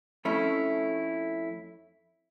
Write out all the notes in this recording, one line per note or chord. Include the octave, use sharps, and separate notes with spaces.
F2 A3 C#4 E4